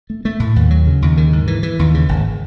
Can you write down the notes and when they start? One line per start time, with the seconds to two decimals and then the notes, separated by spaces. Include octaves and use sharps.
0.10 A3
0.25 A3
0.40 A2
0.56 D#2
0.71 F#3
0.87 C#3
1.02 D#2
1.17 D#3
1.33 G#2
1.47 E3
1.63 E3
1.79 D#2
1.94 C#3
2.09 G#1